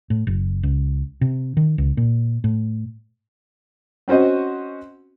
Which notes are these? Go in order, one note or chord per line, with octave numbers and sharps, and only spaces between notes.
A2
F#1
C#2
C3
D#3
C#2
A#2
A2
C4 C#4 F#4 C5 D#5